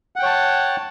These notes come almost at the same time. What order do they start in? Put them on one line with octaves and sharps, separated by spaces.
F#5 G5 C#5 A5